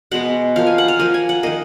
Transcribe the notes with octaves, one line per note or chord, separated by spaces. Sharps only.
B2 G#3 B3 F#5
F3 A#3 F5
G#5
F#5
F5
F3 A#3 G#5
G#5
F#5
D#3 A#3 D#5